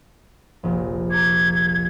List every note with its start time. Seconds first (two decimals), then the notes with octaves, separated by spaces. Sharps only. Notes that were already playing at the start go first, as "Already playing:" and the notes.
0.63 F1 A#1
1.10 A#5 C#6 D6 G#6